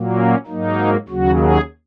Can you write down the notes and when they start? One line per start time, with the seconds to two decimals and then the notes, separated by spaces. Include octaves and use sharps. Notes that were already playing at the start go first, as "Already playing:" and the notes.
Already playing: A#2 F#3 A#3
0.16 C#4
0.47 G#2 F#3 A#3 D#4
1.08 D#2 C#3 F#3 F#4
1.39 G#4